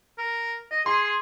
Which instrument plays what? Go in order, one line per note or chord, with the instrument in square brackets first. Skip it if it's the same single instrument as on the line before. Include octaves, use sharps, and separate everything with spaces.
[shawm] A#4
D#5
[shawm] G#4 [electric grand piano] C6